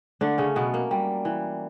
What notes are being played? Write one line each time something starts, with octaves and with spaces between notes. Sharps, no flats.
D3 A3 D4
C#3 C#4
B2 F#3 B3
A#3
G3
E3